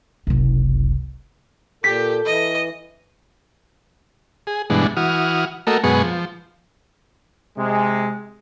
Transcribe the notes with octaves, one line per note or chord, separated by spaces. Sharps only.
F#1 C2
A#2 G4 A4 B6
E3 D#5
G#4
G2 B2 E3 G#3 D4
E3 F#4 D#6 F6
A3 A#3 F#4 A4 A#4 D#5
F#2 B2 G#3 B3 G#4 C#6
F3
C3 G#3